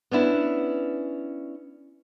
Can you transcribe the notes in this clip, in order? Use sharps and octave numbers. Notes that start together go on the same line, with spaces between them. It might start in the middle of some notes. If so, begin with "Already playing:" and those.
B3 C#4 D4 E4